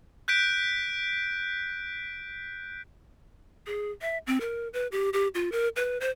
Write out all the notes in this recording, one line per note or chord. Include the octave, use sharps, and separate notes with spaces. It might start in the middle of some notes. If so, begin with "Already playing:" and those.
F#6 G6 B6 D7
G#4
E5
C4
A#4
B4
G4
G4
F4
A#4
B4
C5